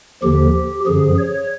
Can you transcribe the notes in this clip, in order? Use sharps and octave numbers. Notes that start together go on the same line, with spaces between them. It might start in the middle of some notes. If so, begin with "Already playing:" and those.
D#2 D3 F3 G4
F#2 D3 F3 G#4
C#5